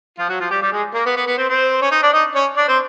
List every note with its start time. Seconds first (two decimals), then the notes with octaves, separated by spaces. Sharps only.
0.19 F3 F4
0.29 F#3 F#4
0.40 F3 F4
0.51 G3 G4
0.62 G3 G4
0.72 G#3 G#4
0.94 A#3 A#4
1.06 B3 B4
1.16 B3 B4
1.27 B3 B4
1.37 C4 C5
1.49 C4 C5
1.82 C#4 C#5
1.91 D#4 D#5
2.02 D4 D5
2.13 D#4 D#5
2.35 C#4 C#5
2.56 D4 D5
2.68 C4 C5